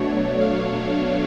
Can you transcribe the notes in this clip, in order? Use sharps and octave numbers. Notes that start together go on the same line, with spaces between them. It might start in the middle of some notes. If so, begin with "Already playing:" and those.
Already playing: B2 F#3 A3 D4 C#5
F5